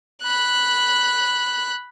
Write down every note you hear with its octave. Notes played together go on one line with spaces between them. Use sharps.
B5 F#6